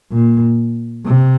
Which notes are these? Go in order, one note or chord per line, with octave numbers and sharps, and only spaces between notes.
A#2
C3